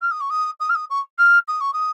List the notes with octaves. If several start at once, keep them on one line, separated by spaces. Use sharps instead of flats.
F6
D#6
C#6
D#6
D#6
F6
D#6
C#6
F6
D#6
C#6
D#6